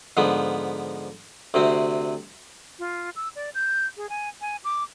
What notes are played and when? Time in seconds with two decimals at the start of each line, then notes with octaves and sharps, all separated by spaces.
0.17 G#2 D3 F3 B3
1.54 D2 C3 C4
2.79 F4
3.16 E6
3.36 D5
3.55 G6
3.97 G#4
4.09 G#5
4.41 G#5
4.64 D6